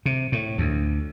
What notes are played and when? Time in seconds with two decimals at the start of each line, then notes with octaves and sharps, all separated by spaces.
0.06 C3
0.32 A2
0.58 D2